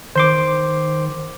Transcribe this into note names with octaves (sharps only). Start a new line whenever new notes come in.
D#3 C5 C6 D6